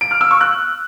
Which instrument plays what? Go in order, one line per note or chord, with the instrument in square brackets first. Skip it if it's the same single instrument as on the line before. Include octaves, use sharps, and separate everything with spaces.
[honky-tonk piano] D7
F6
E6
C#6
F#6